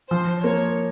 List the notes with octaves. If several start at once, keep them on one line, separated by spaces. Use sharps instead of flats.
F3 C5
A#3 C#5